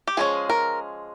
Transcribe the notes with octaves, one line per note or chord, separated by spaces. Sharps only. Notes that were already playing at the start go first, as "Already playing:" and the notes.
G4
F3 G#3 C#4 G#4
A#4